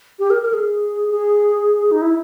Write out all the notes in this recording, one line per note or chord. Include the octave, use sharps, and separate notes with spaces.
G4
A#4
A#4
G#4
G#4
D#4
E4